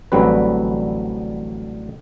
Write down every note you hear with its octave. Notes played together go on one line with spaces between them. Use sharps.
A1 D3 F#3 G3 C4 B4